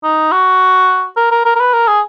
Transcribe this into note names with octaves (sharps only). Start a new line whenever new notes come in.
D#4
F#4
A#4
A#4
A#4
A#4
B4
A#4
G#4